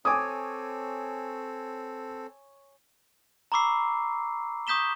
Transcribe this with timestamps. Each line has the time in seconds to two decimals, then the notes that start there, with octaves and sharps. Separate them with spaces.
0.05 C4 A4 C#5 G#5 D6 D#6
3.52 A#5 B5 C#6 D6 E6 C7
4.67 C#6 D#6 G6 B6 E7 G7